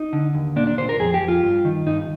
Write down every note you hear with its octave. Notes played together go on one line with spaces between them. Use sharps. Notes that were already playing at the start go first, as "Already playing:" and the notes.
Already playing: D#4
D3
D#2
A#2 D4
D4
A#2 C5
A#4
F2 G#4
G4
F2
F4
G2
D#3
G2 D#4